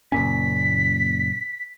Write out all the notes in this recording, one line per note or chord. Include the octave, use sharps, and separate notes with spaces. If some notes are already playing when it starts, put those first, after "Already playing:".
F#1 A#2 C#4 B6